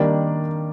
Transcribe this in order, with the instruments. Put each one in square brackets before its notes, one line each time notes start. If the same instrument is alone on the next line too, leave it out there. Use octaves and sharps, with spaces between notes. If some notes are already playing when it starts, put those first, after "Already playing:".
Already playing: [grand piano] D#3 G3 A#3 D4 D5